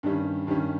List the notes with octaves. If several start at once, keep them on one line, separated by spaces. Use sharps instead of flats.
G2 D#3 G3 C#4
G2 D#3 G3 C#4